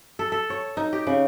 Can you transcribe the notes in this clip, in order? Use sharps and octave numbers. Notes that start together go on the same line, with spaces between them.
A4
A4
C#5
D#4
G4
C#3